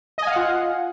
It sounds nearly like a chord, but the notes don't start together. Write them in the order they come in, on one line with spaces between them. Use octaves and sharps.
D#5 G#5 F5 F#5 F4